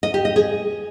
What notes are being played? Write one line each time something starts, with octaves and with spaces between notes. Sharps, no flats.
D#5
G4
D#5
G#4